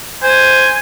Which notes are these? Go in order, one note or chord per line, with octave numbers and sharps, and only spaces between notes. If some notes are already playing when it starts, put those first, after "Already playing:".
C5 G#5